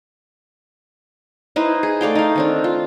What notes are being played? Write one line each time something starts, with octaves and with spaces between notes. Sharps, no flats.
D#4 E4 B4 C5
G#4
A3 D5 F5 G5
D#4 F5
D#3 C4 D4
F4